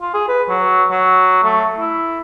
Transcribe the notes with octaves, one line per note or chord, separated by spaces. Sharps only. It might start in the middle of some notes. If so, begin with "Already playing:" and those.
F4
G#4
B4
F#3
F#3
A3
E4